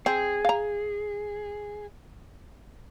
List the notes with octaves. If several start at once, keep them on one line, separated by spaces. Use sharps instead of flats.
C4 G#4
F5 A#5